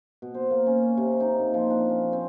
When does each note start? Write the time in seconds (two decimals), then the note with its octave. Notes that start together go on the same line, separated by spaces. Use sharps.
0.22 B2
0.34 C5
0.51 A#3
0.66 C#4
0.97 C3
1.20 D#4
1.39 A#2
1.54 F3
1.70 D4
1.89 C#4
2.13 C4